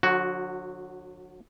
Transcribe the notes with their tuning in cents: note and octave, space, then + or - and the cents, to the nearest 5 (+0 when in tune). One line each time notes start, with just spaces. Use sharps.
D3 +20 F#3 -35 F#4 +0